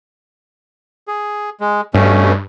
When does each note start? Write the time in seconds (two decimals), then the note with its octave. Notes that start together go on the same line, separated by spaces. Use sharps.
1.08 G#4
1.60 G#3
1.94 G2 B2 A3 C#4